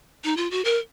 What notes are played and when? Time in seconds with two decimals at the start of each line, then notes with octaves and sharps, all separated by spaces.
0.24 D#4
0.37 F4
0.51 F#4
0.65 A#4